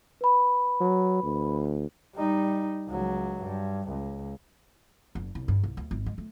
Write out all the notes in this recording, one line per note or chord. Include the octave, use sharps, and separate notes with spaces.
B4 B5
F#3
D2
G3 D#4
C#2 F#3
G2
C#2
F#1
C2
G2
C2
D2
G#1
G#3
A3